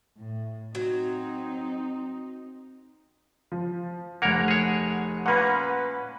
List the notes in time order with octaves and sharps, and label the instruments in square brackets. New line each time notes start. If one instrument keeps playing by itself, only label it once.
[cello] A2
[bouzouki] F#3 [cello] C4 D#4
[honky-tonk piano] F3
[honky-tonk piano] F1 F#5 [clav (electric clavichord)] A#3 A#4 C#5
[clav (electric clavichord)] G#4 C#5
[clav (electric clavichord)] A#2 A#3 C#4 [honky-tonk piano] B4 F#5